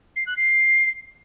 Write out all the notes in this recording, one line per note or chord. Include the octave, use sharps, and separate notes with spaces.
C7
F#6
C7